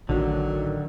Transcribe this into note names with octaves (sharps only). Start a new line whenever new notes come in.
A1 D3 D#3 F#3